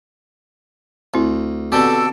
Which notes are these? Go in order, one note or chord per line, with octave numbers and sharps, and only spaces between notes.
D2 C4 E4
B2 D3 C4 G4 A4 D6 E6